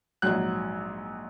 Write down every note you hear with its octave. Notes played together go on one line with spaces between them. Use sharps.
A#1 G#2 F#3 F#6